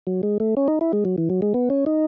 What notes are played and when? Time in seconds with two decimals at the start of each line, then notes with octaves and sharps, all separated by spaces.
0.07 F#3
0.23 G#3
0.40 A3
0.57 C#4
0.68 D#4
0.81 E4
0.93 G#3
1.05 F#3
1.18 E3
1.30 F#3
1.42 G#3
1.54 B3
1.70 C#4
1.86 D#4